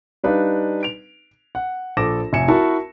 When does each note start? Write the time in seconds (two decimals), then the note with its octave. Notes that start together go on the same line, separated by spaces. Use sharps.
0.24 G3 D4 D#4 B4 D5 F5
0.83 D7 F7
1.55 F#5
1.97 A#1 A4 C5 D6 A#6 E7
2.33 F1 E5 G#5 C#7 E7
2.48 E4 F#4 A#4 A5